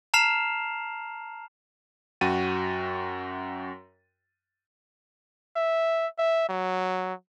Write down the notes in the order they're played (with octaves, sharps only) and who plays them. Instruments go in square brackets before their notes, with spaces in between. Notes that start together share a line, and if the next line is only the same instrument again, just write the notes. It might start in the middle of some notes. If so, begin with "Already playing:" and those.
[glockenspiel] A5 A#5 F6 C7 E7 F7
[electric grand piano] F#2 F#4 G5 A6 D#7
[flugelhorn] E5
E5
F#3